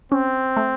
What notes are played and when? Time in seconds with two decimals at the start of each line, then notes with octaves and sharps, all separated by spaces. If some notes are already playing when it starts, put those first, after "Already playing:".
0.12 C4 C#4
0.57 A3